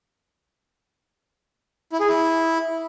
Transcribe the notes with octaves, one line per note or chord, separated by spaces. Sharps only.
E4
G#4
E4